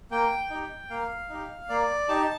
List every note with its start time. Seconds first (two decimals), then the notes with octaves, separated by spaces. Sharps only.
0.11 A#3 G5
0.50 D#4 G4
0.90 A#3 F5
1.29 D#4 G4
1.69 A#3 D5
2.09 D#4 G4 A5